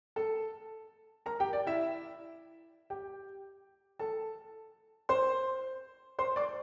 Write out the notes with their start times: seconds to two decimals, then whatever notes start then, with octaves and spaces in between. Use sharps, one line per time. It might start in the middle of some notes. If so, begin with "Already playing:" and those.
0.16 A4 A5
1.26 A#4 A#5
1.40 G4 G5
1.53 D5
1.67 E4 E5
2.90 G4 G5
3.99 A4 A5
5.09 C5 C6
6.19 C5 C6
6.36 D5 D6